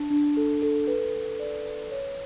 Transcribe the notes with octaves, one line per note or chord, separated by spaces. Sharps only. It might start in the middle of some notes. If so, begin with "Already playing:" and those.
Already playing: D4 A5
D4
A4
A4
B4
B4
D5
B4
C#5